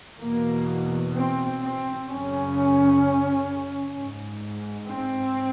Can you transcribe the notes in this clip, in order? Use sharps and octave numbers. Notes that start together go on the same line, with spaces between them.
E2 B2 A#3
C4
C4
F#2 C#3 C#4
G#2
C4